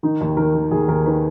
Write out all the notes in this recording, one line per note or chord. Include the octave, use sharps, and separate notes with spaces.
D#3 D#4
D#2
D#3 A#4
D#3
D#2 G#4
D#2 A#4
D#3 B4